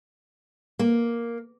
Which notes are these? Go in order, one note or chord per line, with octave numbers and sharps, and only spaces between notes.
A#3